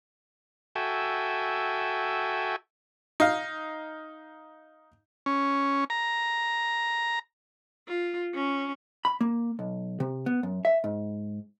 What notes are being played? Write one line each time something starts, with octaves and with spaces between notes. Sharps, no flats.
F#4 A4 E5 G5 G#5
D#4 F5
C#4
A#5
F4
C#4
B5
A#3
B1
C3
B3
F#2
E5
G#2